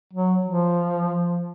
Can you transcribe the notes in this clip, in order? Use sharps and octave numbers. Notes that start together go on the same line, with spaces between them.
F#3
F3